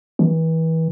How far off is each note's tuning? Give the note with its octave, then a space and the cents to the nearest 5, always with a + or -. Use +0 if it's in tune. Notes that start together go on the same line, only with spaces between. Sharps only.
E3 -30